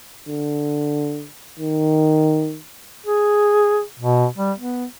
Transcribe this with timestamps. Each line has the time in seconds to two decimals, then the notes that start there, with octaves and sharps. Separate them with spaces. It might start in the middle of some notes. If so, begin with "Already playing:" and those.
0.29 D3
1.60 D#3
3.06 G#4
3.99 B2
4.37 G3
4.58 B3